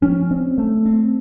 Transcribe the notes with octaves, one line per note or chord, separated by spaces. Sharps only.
F3 C#4
C4
A3
C4